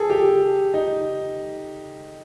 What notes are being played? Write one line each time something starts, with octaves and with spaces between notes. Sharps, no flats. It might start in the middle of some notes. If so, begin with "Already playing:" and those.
Already playing: G#4 A4
G4
D#4